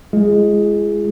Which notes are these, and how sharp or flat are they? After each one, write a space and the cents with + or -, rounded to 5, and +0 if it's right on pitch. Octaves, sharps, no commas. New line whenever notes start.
G#3 +0 F4 -40 G#4 +0